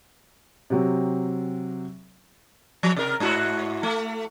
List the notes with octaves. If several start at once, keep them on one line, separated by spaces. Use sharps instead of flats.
C3 F#3 C4
F3
C3 A#4
G#2 E4 F#4
A3